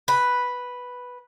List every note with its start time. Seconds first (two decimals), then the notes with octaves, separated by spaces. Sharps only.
0.08 B4